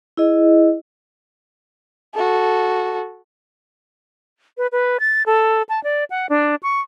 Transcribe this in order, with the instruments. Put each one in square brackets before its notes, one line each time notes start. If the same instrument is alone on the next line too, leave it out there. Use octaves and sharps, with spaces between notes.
[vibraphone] E4 G#4 D#5
[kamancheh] F#4 A4
[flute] B4
B4
A6
A4
A5
D5
F#5
D4
C#6